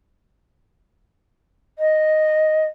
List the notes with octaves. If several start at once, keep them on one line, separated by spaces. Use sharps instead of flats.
D#5